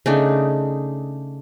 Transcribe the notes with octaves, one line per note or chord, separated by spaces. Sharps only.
C#3 A3 D4 D#4